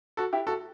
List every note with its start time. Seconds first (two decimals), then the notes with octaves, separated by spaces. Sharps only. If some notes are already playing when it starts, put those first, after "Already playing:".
0.17 F#4 A4
0.33 E4 G4
0.47 F#4 A4